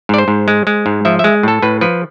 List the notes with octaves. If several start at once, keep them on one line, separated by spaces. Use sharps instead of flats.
G#2 D5
C5
G#2
G#3
G#3
G#2
F3 E5
G#3 E5
A2 A4
A2 B4
F3 B4